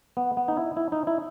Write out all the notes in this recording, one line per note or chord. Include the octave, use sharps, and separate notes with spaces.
B3
B3
D#4
E4
E4
D#4
E4